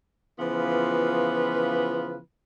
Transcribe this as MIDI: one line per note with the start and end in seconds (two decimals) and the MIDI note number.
0.39 2.18 49
0.39 2.18 52
0.39 2.18 53
0.39 2.18 59
0.39 2.18 65
0.39 2.18 71